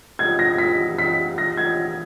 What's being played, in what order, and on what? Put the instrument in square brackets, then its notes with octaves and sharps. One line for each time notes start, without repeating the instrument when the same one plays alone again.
[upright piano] G#6
A#6
B6
B6
A#6
G#6